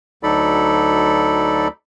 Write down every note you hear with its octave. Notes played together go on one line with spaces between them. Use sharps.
D2 F#3 D#4 A4 D5 B5